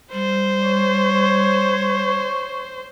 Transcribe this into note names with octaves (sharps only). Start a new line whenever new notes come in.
G3 C5
C#5